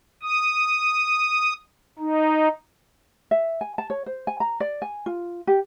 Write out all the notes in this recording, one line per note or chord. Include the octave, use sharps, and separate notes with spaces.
D#6
D#4
E5
G#5
A5
C#5
C5
G#5
A#5
D5
G#5
F4
G4